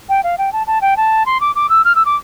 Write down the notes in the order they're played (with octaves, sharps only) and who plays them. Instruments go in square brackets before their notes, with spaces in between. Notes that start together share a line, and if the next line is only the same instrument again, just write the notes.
[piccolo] G5
F5
G5
A5
A5
G5
A5
C6
D6
D6
E6
F6
E6
D6